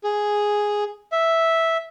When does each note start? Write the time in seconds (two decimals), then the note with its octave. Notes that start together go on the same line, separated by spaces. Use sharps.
0.04 G#4
1.12 E5